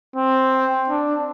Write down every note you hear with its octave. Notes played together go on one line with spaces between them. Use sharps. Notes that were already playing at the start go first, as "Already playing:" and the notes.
C4
D4